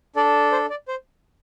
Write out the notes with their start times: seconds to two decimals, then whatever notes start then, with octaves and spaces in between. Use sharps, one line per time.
0.16 D4 A4 D5
0.52 C5
0.70 D5
0.88 C5